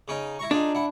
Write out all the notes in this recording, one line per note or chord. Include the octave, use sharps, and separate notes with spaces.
C#3 C#4 D#4
E4 A#5 C#6
D4 D#4 F4 G#4
E4 F#5